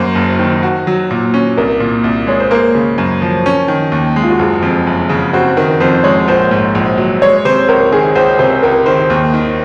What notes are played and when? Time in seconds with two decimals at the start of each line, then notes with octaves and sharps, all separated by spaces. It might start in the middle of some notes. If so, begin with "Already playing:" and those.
Already playing: F#2 A#3 C5
0.15 F#1
0.39 D#3
0.63 F#4
0.87 F#3
1.11 A#2
1.34 C#4
1.57 C2 A#4
1.80 A#2
2.04 C2
2.27 G#3 C#5
2.40 C5
2.51 A#3 A#4
2.75 C#3
2.98 F#2
3.22 F3
3.46 C#4
3.68 D#3
3.92 D#2
4.16 G#3
4.23 F4
4.30 F#4
4.39 F#1 G#4
4.62 F2
4.87 F#1
5.09 C#3
5.33 C4 F#4
5.57 D#3 A#4
5.80 F2 C5
6.04 G#3 C#5
6.28 A#1 C5
6.51 G#2
6.75 A#1
6.98 F#3
7.22 G#3 C#5
7.45 C3 C5
7.68 C#2 A#4
7.92 D#3 G#4
8.15 C#2 C5
8.39 C3 C5
8.63 C#2 A#4
8.86 D#3 C5
9.10 D#2
9.34 D#3